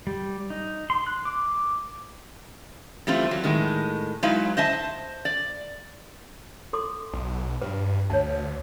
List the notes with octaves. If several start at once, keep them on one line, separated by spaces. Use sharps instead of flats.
G3
D#4
C6
F#6
D6
E3 G3 A3 C4 F4
F#3
A2 D#3 G#3
F#3 G#3 D#4 E4 B4 F5
C5 D#5 E5 A5
D5
A4 C6 D6
B1
G2 B4
D2 C#5 A5